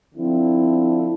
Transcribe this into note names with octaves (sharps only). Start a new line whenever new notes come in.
D3 F3 C4 E4